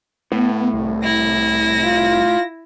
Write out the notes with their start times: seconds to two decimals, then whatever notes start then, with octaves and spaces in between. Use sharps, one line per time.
0.32 A2 B3
0.73 C2
1.03 E4 A#6
1.84 F4